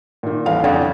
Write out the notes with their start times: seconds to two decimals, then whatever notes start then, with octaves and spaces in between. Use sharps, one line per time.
0.23 A#2 D#3
0.46 D#1 E3 F5
0.64 F2 C#3 C#4 D4 F#5